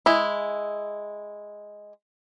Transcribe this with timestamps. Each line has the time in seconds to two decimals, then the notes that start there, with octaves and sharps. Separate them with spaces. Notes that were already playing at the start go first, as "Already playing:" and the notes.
0.06 G#3 E4